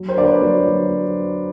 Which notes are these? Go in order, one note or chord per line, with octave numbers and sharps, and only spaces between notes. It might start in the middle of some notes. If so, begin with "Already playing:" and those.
Already playing: F#3
A#4 C5
D3 D5
B4 C#5
F#3
F#3